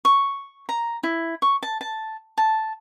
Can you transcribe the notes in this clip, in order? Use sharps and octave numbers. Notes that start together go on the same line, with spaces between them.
C#6
A#5
E4
C#6
A5
A5
A5